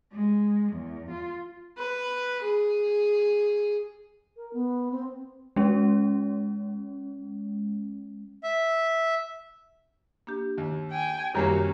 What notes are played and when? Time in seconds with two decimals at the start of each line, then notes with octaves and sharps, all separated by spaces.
0.12 G#3
0.73 E2
1.11 F4
1.78 B4
2.43 G#4
4.37 A#4
4.53 B3
4.92 C4
5.56 G#3 C#4
8.43 E5
10.27 A#3 D4 G4
10.58 D#2
10.91 G5 G#5
11.34 F#2 C3 D#3 F#3 G3 A#3 C#4